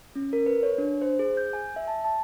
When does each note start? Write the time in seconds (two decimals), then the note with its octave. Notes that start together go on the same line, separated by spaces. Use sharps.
0.16 C#4
0.33 A#4
0.46 B4
0.63 C#5
0.78 D4
1.02 C5
1.19 G#4
1.37 G6
1.53 G#5
1.76 E5
1.88 A5
2.05 A5